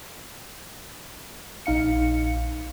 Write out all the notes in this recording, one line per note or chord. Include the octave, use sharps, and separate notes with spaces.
A#1 D#4 F5 C#7